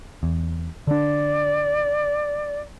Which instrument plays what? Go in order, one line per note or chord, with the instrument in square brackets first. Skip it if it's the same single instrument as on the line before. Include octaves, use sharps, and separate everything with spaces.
[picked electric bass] E2
[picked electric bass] D3 D4 [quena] D5